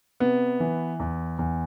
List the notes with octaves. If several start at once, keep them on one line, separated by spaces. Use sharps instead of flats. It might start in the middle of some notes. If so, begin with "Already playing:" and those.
C3 B3
E3
E2
E2